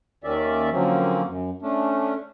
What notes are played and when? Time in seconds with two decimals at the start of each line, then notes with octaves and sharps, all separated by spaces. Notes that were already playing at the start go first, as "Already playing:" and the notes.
0.24 D#2 D#3 C#4 D5 E5
0.72 D3 F3 F#3 A#3 C4 C#4
1.27 F#2
1.62 A3 C#4 D4